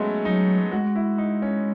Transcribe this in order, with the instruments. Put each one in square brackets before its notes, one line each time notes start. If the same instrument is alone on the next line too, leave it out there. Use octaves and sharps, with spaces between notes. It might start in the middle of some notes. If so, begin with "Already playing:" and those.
Already playing: [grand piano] F#3 G#3 A3 B3 C#4
[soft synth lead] F#3 [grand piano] D#4
[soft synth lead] G#3 [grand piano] F#4
[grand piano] E4
D#4
C#4